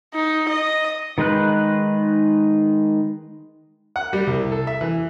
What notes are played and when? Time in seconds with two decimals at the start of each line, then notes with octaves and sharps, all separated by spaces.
0.14 D#4
0.49 D#5
1.18 D#3 G#3 D#4 B4 F#6
3.96 F#5
4.13 G3
4.27 C2
4.52 A4
4.67 E5
4.81 E3